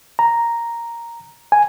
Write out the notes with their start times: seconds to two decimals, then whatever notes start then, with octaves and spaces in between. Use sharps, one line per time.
0.19 A#5
1.52 G#5